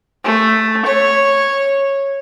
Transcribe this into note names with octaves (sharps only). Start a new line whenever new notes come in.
A3
C#5